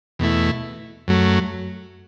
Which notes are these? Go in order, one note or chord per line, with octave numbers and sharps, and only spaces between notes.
E2 B2 A3 E4
F#2 F#3 A3